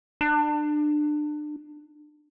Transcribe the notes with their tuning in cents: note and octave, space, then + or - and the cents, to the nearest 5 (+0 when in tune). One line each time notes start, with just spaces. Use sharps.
D4 +30